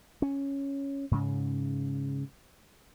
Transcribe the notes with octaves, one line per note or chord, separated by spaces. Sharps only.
C#4
G#2 C#3